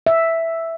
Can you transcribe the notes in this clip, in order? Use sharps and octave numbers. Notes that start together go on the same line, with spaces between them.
E5